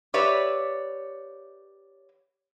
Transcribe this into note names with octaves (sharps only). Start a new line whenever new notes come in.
G4 B4 C#5 D5 E5